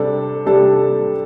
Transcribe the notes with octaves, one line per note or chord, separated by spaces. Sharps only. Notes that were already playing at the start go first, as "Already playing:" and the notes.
Already playing: C3 G3 D4 A4
C3 G3 D4 A4